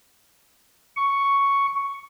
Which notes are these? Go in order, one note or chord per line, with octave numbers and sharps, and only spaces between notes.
C#6